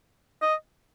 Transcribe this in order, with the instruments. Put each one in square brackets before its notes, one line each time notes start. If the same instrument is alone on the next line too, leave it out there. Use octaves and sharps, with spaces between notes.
[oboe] D#5